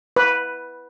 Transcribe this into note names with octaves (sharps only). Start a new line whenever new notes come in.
B4